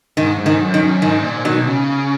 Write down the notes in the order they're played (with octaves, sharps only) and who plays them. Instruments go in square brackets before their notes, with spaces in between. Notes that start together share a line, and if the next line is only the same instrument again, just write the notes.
[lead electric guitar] G#2 [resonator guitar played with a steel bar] D#3
[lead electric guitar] G#2
[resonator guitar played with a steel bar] D#3
[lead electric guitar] F#2
[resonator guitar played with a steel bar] D#3
[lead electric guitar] F#2
[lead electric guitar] G#2 [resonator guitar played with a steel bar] D#3
[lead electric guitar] A#2
[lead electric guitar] B2 [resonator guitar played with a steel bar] D#3 F#3
[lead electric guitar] C#3